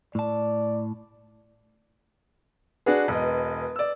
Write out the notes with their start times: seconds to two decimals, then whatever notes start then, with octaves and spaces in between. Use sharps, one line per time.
0.15 A2 D5 A5
2.86 D4 F#4 G#4 B4
3.08 E1 D#5
3.76 D5 E6